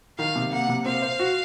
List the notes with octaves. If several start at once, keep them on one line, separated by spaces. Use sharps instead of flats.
D#3 F5
C3
A#3 F#5
C3
C4 F5
C5
F#4